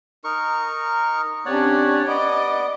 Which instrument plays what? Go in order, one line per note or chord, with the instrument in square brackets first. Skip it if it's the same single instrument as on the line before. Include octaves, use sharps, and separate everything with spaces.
[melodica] D#4 A#4 C#6
[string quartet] C3 C#4 D4 [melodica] C#5 D5 F#5
[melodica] B3 [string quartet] D5 D#5 D6